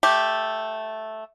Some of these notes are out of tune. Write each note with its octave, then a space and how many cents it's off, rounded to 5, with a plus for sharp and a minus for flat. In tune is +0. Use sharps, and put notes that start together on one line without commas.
A3 -5 G4 +0